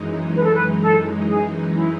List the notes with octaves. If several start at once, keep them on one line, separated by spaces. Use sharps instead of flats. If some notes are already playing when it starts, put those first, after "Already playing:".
Already playing: F#2 E3 G#3 D#4
B4
A4
B4
A4
G#4
E4